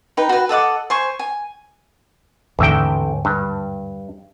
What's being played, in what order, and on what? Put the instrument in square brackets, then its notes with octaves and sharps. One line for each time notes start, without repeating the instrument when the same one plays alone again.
[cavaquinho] D#4 B4 G5
F#4 B4
A4 D#5 F#5 D6
C5 G#5 C#6
G#5
[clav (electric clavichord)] A1 E5 G5 [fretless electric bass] D#2 G#2 D3
[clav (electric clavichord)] G2